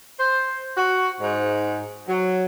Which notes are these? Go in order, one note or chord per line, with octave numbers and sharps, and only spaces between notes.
C5
F#4
G#2
F#3